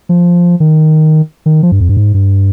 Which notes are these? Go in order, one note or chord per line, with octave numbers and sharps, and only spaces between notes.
F3
D#3
D#3
F3
G2
F2
G2
G#2
G2